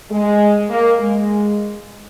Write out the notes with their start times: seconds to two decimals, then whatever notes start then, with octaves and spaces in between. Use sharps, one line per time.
0.11 G#3
0.69 A#3
0.99 G#3